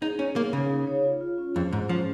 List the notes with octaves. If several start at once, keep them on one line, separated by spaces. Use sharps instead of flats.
D#4 G#4
C#4 D#4
A#3 G#4
C#3 F5
D#4
C#5
F4
F4
C#4
F2 G#4
G#2 G#3
F3 C#4